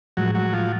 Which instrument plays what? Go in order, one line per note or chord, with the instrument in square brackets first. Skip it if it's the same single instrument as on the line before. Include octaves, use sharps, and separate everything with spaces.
[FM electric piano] A2 F3 G#3 [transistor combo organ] F#3
[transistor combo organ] F#3
F3